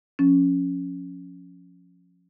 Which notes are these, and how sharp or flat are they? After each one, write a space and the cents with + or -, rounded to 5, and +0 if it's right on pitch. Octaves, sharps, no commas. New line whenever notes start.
F3 +20 C#4 +0